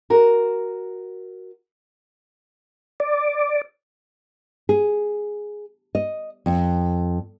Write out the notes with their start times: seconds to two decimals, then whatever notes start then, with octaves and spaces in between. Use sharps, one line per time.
0.10 F#4 A#4
3.00 D5
4.69 G#4
5.95 D#5
6.46 F2